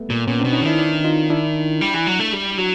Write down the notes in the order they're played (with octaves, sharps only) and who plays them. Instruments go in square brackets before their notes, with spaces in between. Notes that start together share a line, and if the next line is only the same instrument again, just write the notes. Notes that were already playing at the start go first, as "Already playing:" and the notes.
Already playing: [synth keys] G3 A3 B3
[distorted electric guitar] A#2
[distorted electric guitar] A#2 [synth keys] B3 C#4
[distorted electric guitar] B2 [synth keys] C4 D4
[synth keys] C#4 D#4
[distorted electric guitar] D#3 [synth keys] D4 E4
[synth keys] D4 E4
D#4 F4
D4 E4
[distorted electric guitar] G3
E3
F#3
A3
G3
F#3